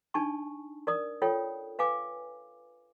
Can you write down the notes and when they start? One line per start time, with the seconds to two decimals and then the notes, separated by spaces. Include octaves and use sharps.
0.14 D4 D#4 G#5 A5 C#6
0.87 A#4 D5 D#6
1.22 F4 A4 C#5 G5
1.79 B4 F5 G#5 D6